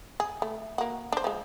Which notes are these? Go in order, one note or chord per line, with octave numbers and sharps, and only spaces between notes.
G#4
A3
A#3 F#4
D4 C5
F3 G#3